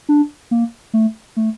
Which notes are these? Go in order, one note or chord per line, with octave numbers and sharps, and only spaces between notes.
D4
A#3
A3
A3